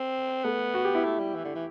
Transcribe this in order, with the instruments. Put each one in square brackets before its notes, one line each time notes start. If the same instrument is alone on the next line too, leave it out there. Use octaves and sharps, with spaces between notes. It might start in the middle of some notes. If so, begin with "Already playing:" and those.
Already playing: [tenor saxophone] C4
[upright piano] A3 [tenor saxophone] B3
[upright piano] F#4
G4
E4
[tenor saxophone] A3
G3
E3
D3
E3